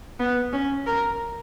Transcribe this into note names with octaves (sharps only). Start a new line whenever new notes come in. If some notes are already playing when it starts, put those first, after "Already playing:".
B3
C#4
A#4